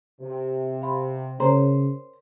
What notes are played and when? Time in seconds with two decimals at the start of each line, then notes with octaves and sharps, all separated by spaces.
0.21 C3
0.82 F5 B5 C6
1.40 C#3 A#4 C5 C#5 A#5